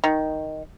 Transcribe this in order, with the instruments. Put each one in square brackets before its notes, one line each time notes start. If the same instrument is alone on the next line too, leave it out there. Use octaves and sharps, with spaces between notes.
[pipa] D#3